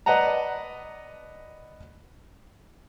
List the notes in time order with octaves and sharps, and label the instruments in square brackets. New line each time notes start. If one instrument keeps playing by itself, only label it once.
[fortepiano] B4 D5 D#5 F#5 A5 A#5